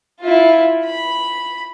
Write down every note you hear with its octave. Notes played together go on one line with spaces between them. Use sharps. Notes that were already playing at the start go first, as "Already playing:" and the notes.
E4 F4
B5